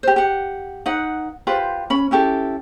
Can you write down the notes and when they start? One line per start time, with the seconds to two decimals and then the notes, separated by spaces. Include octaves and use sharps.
0.03 G4 C5
0.16 G4 F#5
0.86 D#4 B4 F#5
1.47 F4 G4 B4 C5
1.90 C#4 B5
2.11 C#4 E4 G4 A4